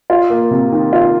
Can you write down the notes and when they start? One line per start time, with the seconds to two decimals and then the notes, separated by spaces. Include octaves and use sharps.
0.10 F4
0.30 A#3
0.51 C3
0.72 D#3
0.93 F4